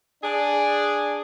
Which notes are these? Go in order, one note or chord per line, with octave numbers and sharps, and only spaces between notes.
D4 G#4